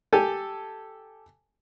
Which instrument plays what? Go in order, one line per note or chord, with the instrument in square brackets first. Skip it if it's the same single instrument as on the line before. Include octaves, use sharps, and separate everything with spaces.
[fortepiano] G4 A4 G5 G#5